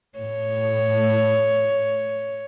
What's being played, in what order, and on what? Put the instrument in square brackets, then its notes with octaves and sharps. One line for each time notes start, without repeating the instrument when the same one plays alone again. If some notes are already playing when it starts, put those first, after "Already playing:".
[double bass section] A2 [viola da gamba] C#5